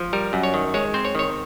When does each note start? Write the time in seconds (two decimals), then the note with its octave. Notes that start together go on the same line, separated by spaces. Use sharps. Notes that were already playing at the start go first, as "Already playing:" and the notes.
Already playing: F3
0.13 G3 A#4
0.33 F#2
0.43 C#5
0.54 D#3
0.74 G#3 C#5
0.94 C4 C5
1.05 C#5
1.15 D#3 C#5